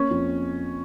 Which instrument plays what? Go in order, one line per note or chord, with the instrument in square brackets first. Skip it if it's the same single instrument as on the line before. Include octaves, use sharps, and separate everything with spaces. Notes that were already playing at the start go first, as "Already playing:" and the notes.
Already playing: [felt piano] A#3 [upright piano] C#4
[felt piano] F2